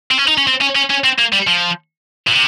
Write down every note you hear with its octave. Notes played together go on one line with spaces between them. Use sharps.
C4
C#4
D#4
C#4
C4
C#4
C#4
C#4
C4
A#3
G3
F3
A#2
C3